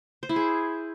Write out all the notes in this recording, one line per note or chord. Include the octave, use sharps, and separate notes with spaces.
C5
E4
G#4